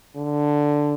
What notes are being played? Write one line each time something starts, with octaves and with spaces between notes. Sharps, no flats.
D3